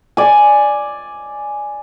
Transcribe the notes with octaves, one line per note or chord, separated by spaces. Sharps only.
D5 G#5